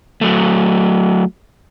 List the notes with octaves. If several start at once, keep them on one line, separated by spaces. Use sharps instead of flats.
F#3 A3